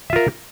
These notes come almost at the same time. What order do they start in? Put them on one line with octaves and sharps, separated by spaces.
E5 F4 A#4